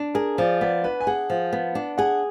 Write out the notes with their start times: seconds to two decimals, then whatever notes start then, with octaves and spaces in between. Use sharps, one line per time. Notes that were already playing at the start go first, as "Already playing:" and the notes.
Already playing: D4
0.15 G#4 A#4
0.38 F3 D5
0.61 B3 D5
0.84 D4 B4
1.01 G#5
1.07 G#4 F#5
1.30 F3
1.53 B3
1.75 D4
1.98 G#4 F#5